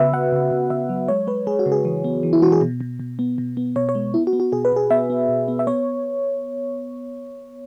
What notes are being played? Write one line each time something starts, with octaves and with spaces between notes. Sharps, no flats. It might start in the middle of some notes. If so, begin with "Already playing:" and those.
Already playing: C#3 B3 F#4 B4 E5
C#3 F#5
C#3
C#3
C#3 E5
F#3
G#3 C#5
G#3 B4
G#3 G#4
F#4
C#3
G#4
E3
B3
E3
E4
E3 F#4
G#4
B2
B2
B2
B3
B2
B3
B2 C#5
C#5
G#3
B3 E4
F#4
B3
F#4
B2 G#4
B4
B2 G#4
B3 E5
B3
B2
B3
E5
B3 C#5